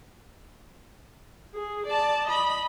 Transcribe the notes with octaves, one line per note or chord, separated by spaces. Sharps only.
G#4
D5 A5
D#5 B5